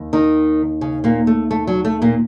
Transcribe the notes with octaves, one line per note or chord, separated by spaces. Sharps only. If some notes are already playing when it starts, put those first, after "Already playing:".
Already playing: D#2
D#3 D#4
C#3 C#4
A#2 A#3
A3
A3
F#3
A3
A#2 A#3